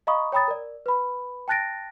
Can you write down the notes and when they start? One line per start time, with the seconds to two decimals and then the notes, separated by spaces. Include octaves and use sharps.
0.07 D#5 F5 A#5 B5 C#6 D#6
0.32 C#5 G5 A#5 B5 D#6 A6
0.48 A#4 D5
0.86 B4 B5
1.48 G5 A5 F#6 A6 A#6 D7